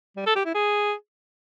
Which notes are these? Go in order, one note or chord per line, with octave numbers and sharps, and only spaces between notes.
G3
A4
G4
E4
G#4